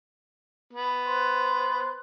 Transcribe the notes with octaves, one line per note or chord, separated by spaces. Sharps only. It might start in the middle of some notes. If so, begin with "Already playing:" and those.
B3
C5 C6 F#6